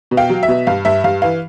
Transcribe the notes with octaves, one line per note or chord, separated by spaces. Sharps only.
B2
F5 G5
F#3
E5
B2
G2 F5
G2 E5
G2 F5
E3 F5